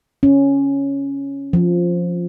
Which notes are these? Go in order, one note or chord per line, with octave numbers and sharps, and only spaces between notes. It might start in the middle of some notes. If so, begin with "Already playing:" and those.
C#4
F3